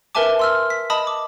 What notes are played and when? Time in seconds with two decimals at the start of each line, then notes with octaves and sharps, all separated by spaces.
0.15 A#4 B4 E5 G#5 A5 D6
0.39 C6 E6 F6
0.70 B6
0.90 D#5 A5 B5 D#6
1.07 D6